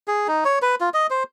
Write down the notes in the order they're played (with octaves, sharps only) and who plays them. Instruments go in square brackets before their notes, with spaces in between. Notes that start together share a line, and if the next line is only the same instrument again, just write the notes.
[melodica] G#4
D#4
C#5
B4
F4
D#5
C5